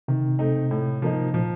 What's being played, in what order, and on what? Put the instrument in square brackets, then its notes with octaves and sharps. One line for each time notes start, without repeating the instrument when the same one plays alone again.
[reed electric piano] C3 [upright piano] D#3
[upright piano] A3 C4 D#4
A2
F3 A#3 D#4
[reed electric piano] A#2 [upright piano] F3